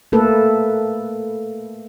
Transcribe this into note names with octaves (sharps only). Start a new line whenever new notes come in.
A3 A#3 A4 B4